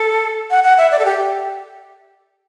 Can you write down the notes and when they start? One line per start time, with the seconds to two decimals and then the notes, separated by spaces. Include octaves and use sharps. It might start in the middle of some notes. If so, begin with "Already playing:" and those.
Already playing: A4
0.51 F#5
0.64 F#5
0.78 E5
0.91 D5
0.99 A4
1.05 G4